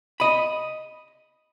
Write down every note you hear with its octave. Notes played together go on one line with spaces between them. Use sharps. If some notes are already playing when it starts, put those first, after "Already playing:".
D#5 B5